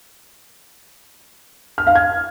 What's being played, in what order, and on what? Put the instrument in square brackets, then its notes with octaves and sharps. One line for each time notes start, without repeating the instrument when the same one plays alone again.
[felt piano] F6
F5
G#6